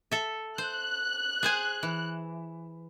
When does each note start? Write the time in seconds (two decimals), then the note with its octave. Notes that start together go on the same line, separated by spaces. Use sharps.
0.11 A4 E5
0.58 C5 F#6
1.43 G#4 C5 G#5
1.83 E3